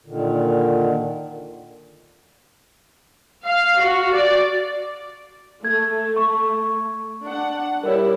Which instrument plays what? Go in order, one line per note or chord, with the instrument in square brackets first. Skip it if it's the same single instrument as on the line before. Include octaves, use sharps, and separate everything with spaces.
[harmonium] A#2 D3 D#3
[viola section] F5
F#4
D5
[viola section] A3 [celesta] G#6
[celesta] C#6
[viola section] D4 F#5
[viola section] G3 E4 [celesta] A#4 C#5